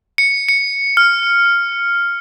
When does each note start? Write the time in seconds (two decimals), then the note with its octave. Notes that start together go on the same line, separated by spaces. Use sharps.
0.18 C#7
0.49 C#7
0.97 F6